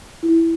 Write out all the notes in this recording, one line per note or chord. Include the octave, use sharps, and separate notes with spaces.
E4